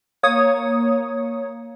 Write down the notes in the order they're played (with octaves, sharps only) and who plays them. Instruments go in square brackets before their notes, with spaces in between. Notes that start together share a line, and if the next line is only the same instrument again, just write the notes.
[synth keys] A#3 C#5 D#6